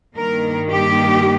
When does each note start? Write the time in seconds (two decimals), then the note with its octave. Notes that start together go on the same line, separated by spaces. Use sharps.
0.16 G2 D#3 A#3 A#4
0.70 G4